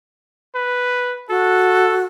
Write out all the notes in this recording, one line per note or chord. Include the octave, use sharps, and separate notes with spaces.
B4
F#4 A4